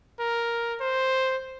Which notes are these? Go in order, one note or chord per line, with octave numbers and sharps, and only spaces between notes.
A#4
C5